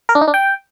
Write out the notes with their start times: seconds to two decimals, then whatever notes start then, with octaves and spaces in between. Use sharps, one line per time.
0.09 A#4
0.15 D4
0.21 D#4
0.28 D4
0.34 G5